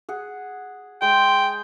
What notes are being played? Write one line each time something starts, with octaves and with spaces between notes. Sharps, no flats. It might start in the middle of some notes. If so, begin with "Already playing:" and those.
G#4 F#5
G#3 G5